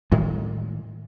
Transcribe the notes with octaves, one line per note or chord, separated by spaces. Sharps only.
A2 D#3 G3 G#3